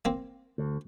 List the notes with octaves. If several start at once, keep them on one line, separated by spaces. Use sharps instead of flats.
A#3 C4
D2